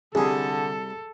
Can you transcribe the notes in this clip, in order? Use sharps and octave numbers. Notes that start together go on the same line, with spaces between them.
C2 D3 G3 G#4 A4